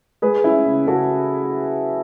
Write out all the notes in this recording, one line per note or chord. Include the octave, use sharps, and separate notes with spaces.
G#3 G#4 B4
C#4 E4
C#3
C#3 F#4 A4